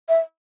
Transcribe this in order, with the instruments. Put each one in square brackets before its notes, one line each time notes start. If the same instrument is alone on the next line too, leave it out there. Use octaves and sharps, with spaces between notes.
[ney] E5